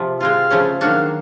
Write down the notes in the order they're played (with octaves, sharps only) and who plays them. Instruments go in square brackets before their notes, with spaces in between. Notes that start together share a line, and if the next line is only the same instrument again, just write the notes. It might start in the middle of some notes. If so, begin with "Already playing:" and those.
Already playing: [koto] C3 F3
[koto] G#3 C4 F4 [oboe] F5
[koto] C#3 F3 A3 C#4
[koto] D#3 F#3 A#3 D4 F#4 [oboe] F5